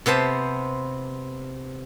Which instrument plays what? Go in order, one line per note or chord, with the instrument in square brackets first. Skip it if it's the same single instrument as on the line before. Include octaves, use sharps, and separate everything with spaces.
[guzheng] C3 B3 C5 A5